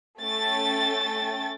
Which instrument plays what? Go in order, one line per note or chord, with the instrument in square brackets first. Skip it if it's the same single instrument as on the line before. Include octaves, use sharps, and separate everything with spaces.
[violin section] A3 C#4 G5 A6